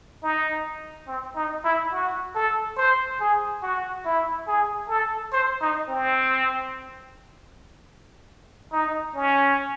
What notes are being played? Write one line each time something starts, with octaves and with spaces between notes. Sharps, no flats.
D#4
C4
D#4
E4
F#4
A4
C5
G#4
F#4
E4
G#4
A4
C5
D#4
C4
D#4
C#4